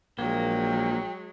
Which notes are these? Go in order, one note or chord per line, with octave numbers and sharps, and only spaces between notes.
A#1 F#3 G#3 A#3 G5